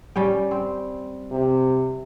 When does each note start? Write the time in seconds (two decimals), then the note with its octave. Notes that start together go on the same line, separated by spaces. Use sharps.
0.16 G3 C#4 G5
0.51 C4
1.31 C3